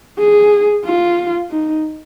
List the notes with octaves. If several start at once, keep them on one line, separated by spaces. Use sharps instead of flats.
G#4
F4
D#4